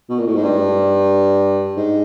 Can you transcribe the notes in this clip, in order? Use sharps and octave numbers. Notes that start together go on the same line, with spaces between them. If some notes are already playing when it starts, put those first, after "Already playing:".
B2
A#2
A2
G#2
G2
G#2